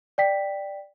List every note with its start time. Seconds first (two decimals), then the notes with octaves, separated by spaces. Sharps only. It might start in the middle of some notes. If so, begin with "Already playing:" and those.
0.18 D5 G5 B6